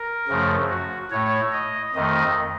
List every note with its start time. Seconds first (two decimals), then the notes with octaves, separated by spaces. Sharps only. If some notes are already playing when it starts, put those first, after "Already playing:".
Already playing: A#4
0.28 F#2 C#3 F3 A3
0.69 F#4
1.11 A2 A3 C#5
1.53 D#5
1.95 F2 D#3 A3 D#5